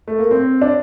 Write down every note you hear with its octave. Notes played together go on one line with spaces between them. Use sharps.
A3
A#3
C4
D4